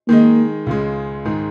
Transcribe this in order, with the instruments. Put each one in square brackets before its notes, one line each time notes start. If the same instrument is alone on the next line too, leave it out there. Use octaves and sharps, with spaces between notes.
[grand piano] D#3 G#3 D#4 [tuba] A#3
[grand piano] C#2 C#3 G#3
G#2 D#3 G#3